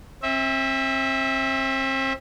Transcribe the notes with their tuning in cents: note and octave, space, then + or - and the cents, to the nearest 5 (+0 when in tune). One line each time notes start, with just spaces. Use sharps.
C4 +35 E5 -15